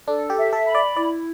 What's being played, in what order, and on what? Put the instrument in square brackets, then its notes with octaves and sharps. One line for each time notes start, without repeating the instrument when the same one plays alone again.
[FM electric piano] D4 [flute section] A4
[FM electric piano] G4
[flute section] E5
[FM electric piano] A4
[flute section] B5
[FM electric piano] D5
[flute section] E4 [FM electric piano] D5